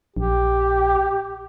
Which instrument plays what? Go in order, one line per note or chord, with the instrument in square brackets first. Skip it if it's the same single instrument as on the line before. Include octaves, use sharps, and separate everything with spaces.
[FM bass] A#1 [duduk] G4